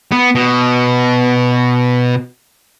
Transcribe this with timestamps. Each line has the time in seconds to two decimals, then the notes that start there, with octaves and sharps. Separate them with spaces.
0.12 B3
0.35 B2